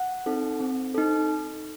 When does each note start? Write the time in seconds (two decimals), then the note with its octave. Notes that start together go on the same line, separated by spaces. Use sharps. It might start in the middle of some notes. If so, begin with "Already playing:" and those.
Already playing: F#5
0.26 C4 D#4 A4
0.60 C4
0.94 D#4 A4